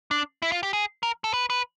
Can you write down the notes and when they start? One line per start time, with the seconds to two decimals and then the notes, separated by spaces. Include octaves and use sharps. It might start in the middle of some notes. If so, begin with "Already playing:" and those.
0.11 D4
0.42 E4
0.52 F4
0.63 G4
0.73 G#4
1.03 A#4
1.24 A4
1.34 B4
1.50 B4